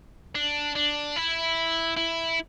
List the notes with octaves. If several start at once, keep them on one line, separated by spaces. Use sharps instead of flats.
D4
D4
E4
E4